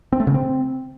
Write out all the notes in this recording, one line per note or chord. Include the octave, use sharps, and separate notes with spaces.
C4
A3
C#3
C4